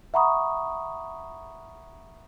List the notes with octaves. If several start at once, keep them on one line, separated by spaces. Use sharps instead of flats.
E5 F#5 A#5 B5 C#6 D#6